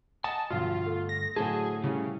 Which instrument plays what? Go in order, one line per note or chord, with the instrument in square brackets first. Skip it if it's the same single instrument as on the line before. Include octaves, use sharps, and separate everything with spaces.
[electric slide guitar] D#5 F#5 G#5 [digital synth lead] A5 [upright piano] D#6
[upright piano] B1 F3 [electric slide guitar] G2 D3 [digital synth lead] F4
[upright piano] A3
[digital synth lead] A#6
[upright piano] A2 D3 [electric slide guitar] F#3 C5 A5 [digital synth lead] G#4
[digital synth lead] C#3 [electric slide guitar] G3 E4 G4